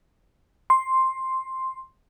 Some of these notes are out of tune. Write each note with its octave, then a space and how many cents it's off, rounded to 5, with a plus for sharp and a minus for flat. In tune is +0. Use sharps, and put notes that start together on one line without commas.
C6 +5